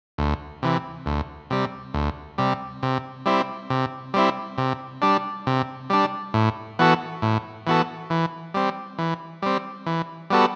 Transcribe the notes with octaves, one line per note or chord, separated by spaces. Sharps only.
D2
C3 E3
D2
C3 G3
D2
C3 G3
C3
G3 C4 E4
C3
G3 C4 E4
C3
G3 D4
C3
G3 D4
A2
E3 B3 F#4 A4
A2
E3 B3 F#4 A4
E3
G3 C4
E3
G3 C4
E3
G3 B3 F#4 A4